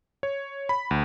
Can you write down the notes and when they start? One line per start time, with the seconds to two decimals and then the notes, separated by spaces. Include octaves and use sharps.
0.23 C#5
0.69 B5
0.91 D2